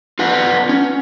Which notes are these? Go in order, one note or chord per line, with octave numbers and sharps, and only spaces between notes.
F4 B4 F#5
C#4